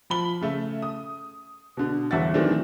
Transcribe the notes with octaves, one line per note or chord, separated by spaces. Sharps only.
F3 B5 G7
C#3 A3 E5
D#6
B2 D3
G1 E2 E5 F#5 A6
D#3 E3 F#3 A3 C4 D4